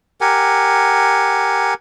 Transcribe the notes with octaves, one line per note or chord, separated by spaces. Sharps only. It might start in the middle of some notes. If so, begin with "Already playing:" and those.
G4 A#4 F#5 G#5